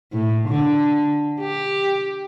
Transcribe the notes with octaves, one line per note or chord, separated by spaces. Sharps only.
A2
D3
G4